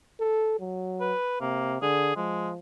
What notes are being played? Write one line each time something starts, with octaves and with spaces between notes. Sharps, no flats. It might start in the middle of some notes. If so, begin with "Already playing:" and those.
A4
F#3
B4
C3 A#3
D3 G#4
F3 G#3